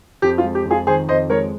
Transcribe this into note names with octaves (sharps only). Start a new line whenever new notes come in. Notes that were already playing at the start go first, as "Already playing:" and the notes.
F2 G4
F4
G#3
G4
F2
F4 G#4
D#3 G#4 C5
F2 C5 D#5
G#3 A#4 C#5